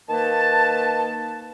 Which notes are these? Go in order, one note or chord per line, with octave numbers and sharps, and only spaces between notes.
D#3 A#3 B4 A5